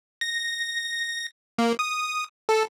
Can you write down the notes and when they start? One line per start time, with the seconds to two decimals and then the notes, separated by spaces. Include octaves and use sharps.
0.21 A#6
1.58 A#3
1.79 D#6
2.49 A4